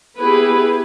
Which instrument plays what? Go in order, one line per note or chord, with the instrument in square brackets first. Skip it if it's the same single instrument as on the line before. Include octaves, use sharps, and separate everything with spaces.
[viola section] B3 E4 G4 G#4 B4